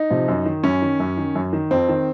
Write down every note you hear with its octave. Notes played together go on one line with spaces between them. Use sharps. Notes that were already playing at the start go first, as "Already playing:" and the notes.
Already playing: D#4
C3 F3
F#2
D#3
F#2 C#4
D#3
F#2
D#3
F#2
D#3
F2 C4
D#3